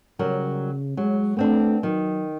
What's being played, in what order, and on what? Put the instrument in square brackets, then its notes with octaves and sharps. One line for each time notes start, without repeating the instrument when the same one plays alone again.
[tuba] C#3 [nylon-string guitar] F#3 G3 A#4
[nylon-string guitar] F#3 [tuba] G#3
[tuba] A3 [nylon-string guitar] B3 C4 D4
[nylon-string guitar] D#3 [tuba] F#3